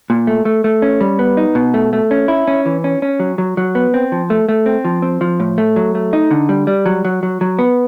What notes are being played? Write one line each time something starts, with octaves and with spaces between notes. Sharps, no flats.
A#2
A3
A3
A3
C#4
G3
B3
D#4
B2
A3
A3
C#4
E4
C#4
E3
C#4
C#4
F#3
F#3
F#3
B3
C4
F3
A3
A3
C4
F3
C4
F3
A2
A3
F#3
A3
D#4
D3
G3
G3
F#3
F#3
F#3
F#3
B3